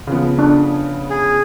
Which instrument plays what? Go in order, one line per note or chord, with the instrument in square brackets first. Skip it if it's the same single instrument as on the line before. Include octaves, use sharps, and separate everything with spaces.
[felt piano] C#3 F3 B3
[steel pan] D4
[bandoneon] G#4